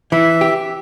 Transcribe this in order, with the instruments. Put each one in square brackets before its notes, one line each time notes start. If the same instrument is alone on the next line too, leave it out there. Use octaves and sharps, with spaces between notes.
[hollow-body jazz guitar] E3 [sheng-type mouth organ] E5
[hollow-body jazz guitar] G4